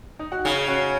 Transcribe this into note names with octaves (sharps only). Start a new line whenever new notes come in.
D#4
F#4
C#3 D#4 G#4
C#4 F#4